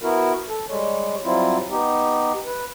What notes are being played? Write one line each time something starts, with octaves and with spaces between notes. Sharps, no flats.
B3 E4 F#4 A#4
A4
G3 G#3 C#5
F#3 G3 C4 E4 F4
B3 D#4 G4
B4